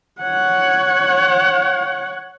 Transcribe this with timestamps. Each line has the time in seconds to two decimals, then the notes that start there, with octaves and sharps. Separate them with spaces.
0.21 C#5 F#5